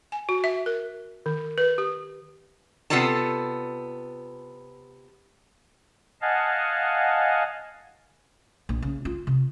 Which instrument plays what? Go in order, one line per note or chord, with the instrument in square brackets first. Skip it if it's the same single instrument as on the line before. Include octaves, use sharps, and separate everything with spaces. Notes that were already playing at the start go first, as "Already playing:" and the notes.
[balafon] G#5
F#4
E5
A#4
D#3
B4
G4
[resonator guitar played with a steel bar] C3 B3 F4 A4 D5 A5
[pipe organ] D#5 F5 F#5 G#5 A5
[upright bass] A#1
C#3
F4
C3